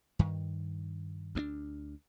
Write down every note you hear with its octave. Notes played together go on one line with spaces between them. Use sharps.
G2 D#3
D2 A#3 D4